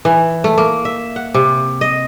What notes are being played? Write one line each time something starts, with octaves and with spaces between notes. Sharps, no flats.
E3
A3
A#3
E5
F#5
C3
D#5